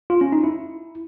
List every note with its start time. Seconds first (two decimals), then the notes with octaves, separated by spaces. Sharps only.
0.10 F4
0.21 C#4
0.32 D#4
0.44 E4